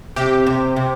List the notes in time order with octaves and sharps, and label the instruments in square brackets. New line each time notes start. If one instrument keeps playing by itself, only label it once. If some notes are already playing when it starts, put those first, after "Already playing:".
[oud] C3 [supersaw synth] G4
[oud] C3
C3